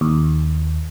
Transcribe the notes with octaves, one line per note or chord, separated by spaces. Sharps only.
D#2